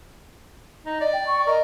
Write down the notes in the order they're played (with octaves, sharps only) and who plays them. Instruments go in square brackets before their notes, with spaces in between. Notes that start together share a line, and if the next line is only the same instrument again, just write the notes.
[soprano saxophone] D#4
[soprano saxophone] D5 [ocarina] D#5
[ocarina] G5
C#6
[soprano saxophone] A#4 [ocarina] D#5